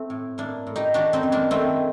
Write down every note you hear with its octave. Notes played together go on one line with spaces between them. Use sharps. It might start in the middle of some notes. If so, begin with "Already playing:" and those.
Already playing: A3 C4
A2
A2 A#3 D4
A2
D#4 G4
D#3 D4 F#4
C4 D#4
F#2
A#3 D4
D#3 A3 C4